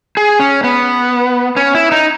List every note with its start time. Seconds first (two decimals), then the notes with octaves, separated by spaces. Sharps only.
0.17 G#4
0.40 C#4
0.64 B3
1.57 C#4
1.75 E4
1.92 D#4